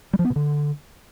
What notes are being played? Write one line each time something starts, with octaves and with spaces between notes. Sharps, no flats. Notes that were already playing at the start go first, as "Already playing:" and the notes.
G3
F3
B3
B2
D3